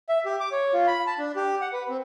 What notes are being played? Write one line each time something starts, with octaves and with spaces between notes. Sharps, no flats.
E5
G4
D6
C#5
F4
B5
A5
D4
G4
F#5
B4
C4